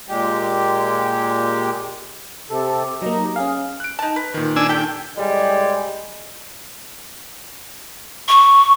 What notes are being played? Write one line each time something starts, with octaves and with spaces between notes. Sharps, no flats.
A#2 G#3 G4
C3 G4 A4
F#3 A#3 D#4 A#5
C#4 G#4 F5
F#6 D7
D#4 A5
B4
A#2 D#3
D4 G#5 E6
G4 A4 G5
A2 G3 G#3
C#6